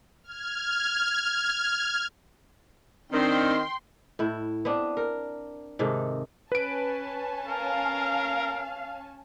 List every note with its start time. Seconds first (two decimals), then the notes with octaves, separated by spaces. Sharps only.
0.23 F6 G#6
3.12 D#3 C4 D4 G5 C6
4.19 A2 E4
4.65 B3 C4 D4
4.97 A#4
5.79 G#2 C3 D#3 A4
6.52 C#4 B4 G#5 A5 D7
7.48 A#4 F5